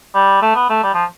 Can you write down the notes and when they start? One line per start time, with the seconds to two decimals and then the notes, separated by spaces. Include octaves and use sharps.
0.15 G3
0.42 A3
0.55 B3
0.70 A3
0.83 G3
0.94 F3